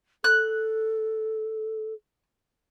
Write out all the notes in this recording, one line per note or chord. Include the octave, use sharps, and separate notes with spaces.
A4 F#6